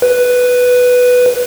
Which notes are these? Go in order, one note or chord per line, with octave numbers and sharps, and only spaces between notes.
B4